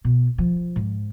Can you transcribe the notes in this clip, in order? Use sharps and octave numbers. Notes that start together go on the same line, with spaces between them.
B2
F3
G#2